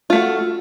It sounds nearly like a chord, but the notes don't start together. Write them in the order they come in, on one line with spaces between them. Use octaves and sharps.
F4 A3 F#4